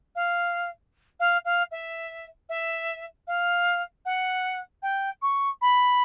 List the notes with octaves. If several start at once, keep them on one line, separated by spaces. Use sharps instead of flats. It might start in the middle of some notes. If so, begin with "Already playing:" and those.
F5
F5
F5
E5
E5
F5
F#5
G5
C#6
B5